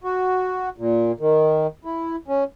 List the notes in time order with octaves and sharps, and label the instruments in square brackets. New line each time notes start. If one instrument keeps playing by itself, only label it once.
[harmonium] F#4
A#2
D#3
E4
C#4